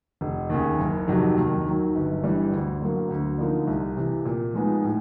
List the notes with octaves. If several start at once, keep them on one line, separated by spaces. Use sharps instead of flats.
F1
D#2 C#3
F#1
F2 C3 D#3 F#3
D#2
D#3 F#3
G1
G2 E3 G3
D2
D3 F#3 A#3
D2
D3 F3 A#3 D#4
C2
C3 E3
A#2
F3 G#3 B3 D#4
A2